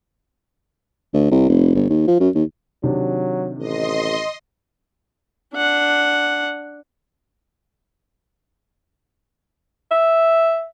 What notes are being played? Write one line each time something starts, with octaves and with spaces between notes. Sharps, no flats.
D2
C2
F1
G1
D#2
F3
F#2
D#2
C3 D#3 F#3 D4
A1 D#5 C6
D4 F#5
E5